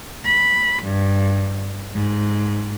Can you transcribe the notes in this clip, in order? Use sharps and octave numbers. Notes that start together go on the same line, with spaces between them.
B5
G2
G#2